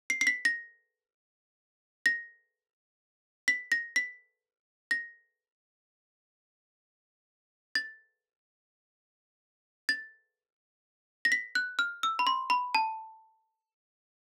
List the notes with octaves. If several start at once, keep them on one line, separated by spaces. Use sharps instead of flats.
C7
C7
B6
A#6
A#6
B6
A#6
B6
A#6
A6
A6
A#6
B6
F#6
F6
E6
B5
C6
B5
A5